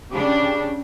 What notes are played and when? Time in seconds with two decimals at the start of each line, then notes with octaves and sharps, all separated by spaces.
0.12 C#3 D4 G4